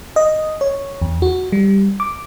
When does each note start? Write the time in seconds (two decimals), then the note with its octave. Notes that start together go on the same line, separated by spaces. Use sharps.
0.16 D#5
0.61 C#5
1.02 E2
1.22 F#4
1.52 G3
2.00 D6